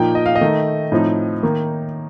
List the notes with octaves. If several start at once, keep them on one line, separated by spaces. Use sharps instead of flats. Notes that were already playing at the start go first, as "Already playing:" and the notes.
Already playing: A#2 F3 A#3 D#4 G5
D#5
F5
D#5
D#3 A3 D#4
A2 F3 C4 D#4
D#3 A#3 D#4